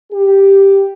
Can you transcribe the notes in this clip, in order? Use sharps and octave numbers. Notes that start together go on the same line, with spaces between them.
G4